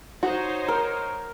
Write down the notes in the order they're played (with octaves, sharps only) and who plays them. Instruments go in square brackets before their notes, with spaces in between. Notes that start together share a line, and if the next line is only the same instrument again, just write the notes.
[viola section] D#4 C5 C#5 [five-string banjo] F#4
[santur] A#4